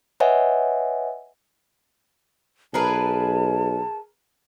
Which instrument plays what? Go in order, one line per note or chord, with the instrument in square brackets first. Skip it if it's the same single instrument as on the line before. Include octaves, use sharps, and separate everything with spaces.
[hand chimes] B4 C#5 D#5 E5 F#5 G#5
[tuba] B1 [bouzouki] G#4 A#4 B4 [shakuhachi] A5